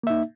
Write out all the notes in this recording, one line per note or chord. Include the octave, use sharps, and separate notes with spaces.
A#3 D#4 E5